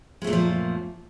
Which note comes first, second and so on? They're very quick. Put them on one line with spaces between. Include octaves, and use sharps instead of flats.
G#3 A3 A#2 F#2 F3